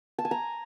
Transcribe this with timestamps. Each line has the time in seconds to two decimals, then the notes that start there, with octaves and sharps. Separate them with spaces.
0.19 A5
0.25 G#5
0.31 A#5